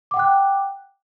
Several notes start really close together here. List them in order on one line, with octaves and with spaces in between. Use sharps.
D6 F#5 G5 F#6